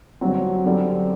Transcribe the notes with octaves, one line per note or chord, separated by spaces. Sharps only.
G1 G2 F#3 C4
F#2 D3 G3 C4